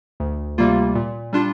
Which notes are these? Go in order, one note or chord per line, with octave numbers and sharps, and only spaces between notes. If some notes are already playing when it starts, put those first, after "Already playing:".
D2
C3 G3 A#3 F4
A#2
G3 D4 F4